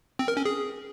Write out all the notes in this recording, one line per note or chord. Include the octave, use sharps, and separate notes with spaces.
C4
A#4
C#4
G#4